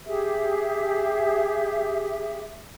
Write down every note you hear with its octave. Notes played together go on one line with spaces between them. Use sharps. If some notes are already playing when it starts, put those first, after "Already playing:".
G4 G#4 E5